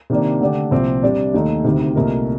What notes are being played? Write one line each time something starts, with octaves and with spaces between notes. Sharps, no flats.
C3 D#3 A#3 D4
D3 A3 D4 G4
C2 A#2 F3 C4 G4
C3 G3 D4
D#2 D#3 A3 D#4
D2 C3 D#3
C2 A#2 A3 D#4 A#4